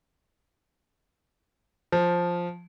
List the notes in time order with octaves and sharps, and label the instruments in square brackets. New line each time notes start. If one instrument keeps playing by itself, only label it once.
[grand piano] F3